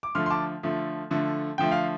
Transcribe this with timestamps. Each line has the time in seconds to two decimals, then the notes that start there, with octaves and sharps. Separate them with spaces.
0.03 D6
0.15 D3 F3 A3 C6 F6
0.26 C6
0.30 A5 D6
0.63 D3 F3 A3
1.10 D3 F3 A3
1.58 D3 F3 A3 G5
1.72 F5